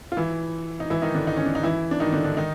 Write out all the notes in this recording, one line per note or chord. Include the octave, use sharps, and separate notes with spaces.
F4
E3 E4
D#4
E3 E4
D#3 D#4
D3 D4
D#3 D#4
C#4
D4
D#4
E3 E4
D4
D#3 D#4
D3 D4
D3 D4
D#3 D#4